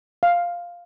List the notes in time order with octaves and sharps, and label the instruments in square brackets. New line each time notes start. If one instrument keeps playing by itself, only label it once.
[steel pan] F5